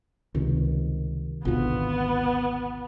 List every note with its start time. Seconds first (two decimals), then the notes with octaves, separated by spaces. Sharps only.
0.35 C#2 C3 D#3
1.45 G#1 D2 B2 B3 F4